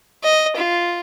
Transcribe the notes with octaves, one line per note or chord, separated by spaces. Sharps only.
D#5
F4